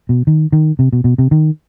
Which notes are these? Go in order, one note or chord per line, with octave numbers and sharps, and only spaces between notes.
B2
D#3
D#3
C3
B2
B2
C3
D#3